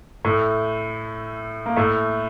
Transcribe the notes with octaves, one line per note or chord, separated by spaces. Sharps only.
A2 A3
A#3
A2 A3